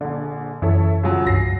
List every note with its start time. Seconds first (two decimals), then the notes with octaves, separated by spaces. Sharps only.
0.01 A#1 D3 D4
0.62 F#2 E3 E4 A4 C#5
1.03 C#3 F3 F#3
1.27 C2 G2 A#6 C7